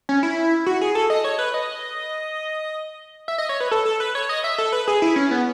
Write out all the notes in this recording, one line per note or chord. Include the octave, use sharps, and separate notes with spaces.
C#4
E4
F#4
G#4
A4
D#5
C#5
B4
D#5
E5
D#5
C#5
B4
A4
A4
B4
C#5
D#5
E5
A4
B4
G#4
E4
C#4
B3